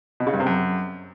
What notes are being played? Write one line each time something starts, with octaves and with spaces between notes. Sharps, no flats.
B2
C#3
G2
C3
F#2